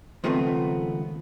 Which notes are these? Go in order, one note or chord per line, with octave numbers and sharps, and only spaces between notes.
C#2 D#3 F3 A3 B3 C4